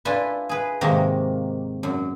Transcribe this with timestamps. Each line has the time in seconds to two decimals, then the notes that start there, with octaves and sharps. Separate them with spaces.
0.05 D4 E4 F4 A4 B4 G#5
0.49 G#4 B4
0.81 G#2 C3 D#3 A#3
1.83 F#2